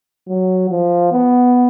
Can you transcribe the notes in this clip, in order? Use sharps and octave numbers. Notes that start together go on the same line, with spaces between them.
F#3
F3
B3